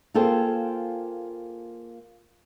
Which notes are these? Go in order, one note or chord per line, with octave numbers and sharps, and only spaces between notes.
A#3 F4 G#4 A4 C5 G5